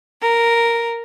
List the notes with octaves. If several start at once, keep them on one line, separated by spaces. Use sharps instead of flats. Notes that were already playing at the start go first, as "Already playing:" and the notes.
A#4